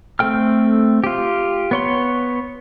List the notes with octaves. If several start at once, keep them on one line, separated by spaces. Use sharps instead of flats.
A3 C4 A4 G5 F6
F4 G4
B3 C#5 C6